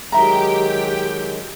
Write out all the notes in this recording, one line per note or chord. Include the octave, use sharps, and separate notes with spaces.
D#3 F#3 G#3 D#4 G4 E5 G5 A#5